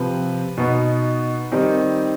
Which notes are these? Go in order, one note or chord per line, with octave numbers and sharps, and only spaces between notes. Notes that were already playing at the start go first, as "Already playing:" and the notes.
Already playing: C3 F3 C4 B4
B2 B3 D#4
D#3 G3 C4 D#4